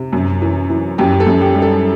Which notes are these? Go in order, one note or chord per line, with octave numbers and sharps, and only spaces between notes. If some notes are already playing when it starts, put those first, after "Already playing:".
Already playing: C3
F#2
E3
E3
F#2 G4
A4
F#2
G4
G3
A4